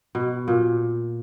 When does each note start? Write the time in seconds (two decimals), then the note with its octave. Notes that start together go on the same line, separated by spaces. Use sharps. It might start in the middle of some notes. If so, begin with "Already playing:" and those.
0.15 B2
0.48 A#2